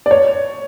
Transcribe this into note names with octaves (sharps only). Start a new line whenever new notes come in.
D5
C#5